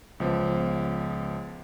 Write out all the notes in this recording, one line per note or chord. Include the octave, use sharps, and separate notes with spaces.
C#2 F3 B3